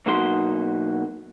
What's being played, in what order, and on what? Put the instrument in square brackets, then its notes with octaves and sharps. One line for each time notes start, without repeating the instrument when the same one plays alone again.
[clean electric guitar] B2 F#3 A#3 D#4 F#4 C6